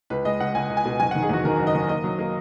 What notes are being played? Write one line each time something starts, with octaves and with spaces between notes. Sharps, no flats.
C#2 B4
G#3 D#5
C#2 F#5
C#2 G#5
C#2
G#5
B2
F#1 G#5
F#5
D#3
G#4
E2 F#4
D#3 A#4
F#1
D#5
D#3
A#3 D#5
F#3
A#3